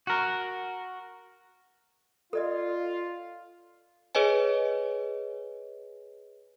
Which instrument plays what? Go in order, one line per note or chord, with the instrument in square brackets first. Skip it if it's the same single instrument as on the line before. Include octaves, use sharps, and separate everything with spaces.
[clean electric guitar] F#4 A#4
[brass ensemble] F4 [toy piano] A4 D5 D#5
[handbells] G#4 B4 C#5 D#5 G#5